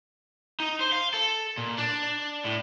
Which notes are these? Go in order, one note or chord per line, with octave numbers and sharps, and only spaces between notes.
D#4
C5
F5
A4
A#2
D4
A2